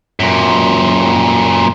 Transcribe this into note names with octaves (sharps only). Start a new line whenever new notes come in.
F#2 A#2